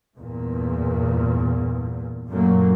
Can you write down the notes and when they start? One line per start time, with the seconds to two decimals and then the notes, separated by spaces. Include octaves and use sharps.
0.16 E2 G2 A#2
2.29 F#2 A#2 F#3 A3 A#3